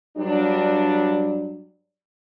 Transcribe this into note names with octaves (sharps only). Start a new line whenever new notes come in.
G2 F#3 G3 D4